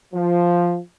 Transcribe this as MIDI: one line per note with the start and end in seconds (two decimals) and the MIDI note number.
0.14 0.77 53